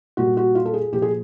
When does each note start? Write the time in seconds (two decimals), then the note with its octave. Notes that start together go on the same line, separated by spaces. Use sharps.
0.17 A#2 G3 F#4
0.37 F#4
0.55 F4
0.65 A4
0.74 G#4
0.92 A#2 F3 G4
1.02 G#4